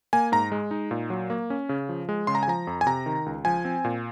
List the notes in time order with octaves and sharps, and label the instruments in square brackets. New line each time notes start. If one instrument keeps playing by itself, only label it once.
[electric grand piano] A#3 G#5
G#2 A#5
G#3
D#4
A#2
F#3
A#3
C#4
C#3
F3
G#3
C#3 C6
A#5
G#5
F3 A#5
F2
G#5
C3 A#5
D#3
C#2
F3 G#5
C4
A#2